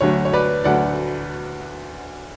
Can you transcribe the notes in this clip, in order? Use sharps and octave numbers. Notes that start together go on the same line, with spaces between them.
D2 D3 F#3 A3 C#5
C#5
B4 D5
D2 D3 F#3 A3 D5 F#5